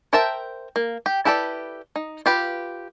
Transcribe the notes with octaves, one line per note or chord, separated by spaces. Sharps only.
A#4 C5 E5 G5 A5
A#3
G4 G5
E4 G4 A4 B4 D5
D#4
F4 G4 B4